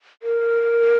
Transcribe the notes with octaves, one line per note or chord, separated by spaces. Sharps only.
A#4